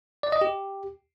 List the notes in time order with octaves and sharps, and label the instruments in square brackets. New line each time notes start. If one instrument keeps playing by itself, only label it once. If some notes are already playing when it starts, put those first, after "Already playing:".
[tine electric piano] D5
D#5
G4